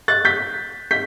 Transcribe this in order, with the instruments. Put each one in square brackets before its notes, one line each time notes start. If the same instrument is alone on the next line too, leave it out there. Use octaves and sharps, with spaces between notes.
[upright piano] F#6 A6
G6 B6
G6 B6